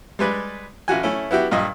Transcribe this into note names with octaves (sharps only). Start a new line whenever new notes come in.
G3 G#3 B4 D5
A1 F4 F#4 G#5
A3 C#4 E4
B3 E4 F#4 G4
G2 A#2 D#5